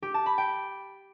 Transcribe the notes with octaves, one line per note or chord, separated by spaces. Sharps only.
G4
A5
B5
G5